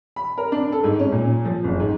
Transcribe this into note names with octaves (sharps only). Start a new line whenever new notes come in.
B5
A#4
D4
A4
G#2
C#4
A#2
F3
F#1
G#2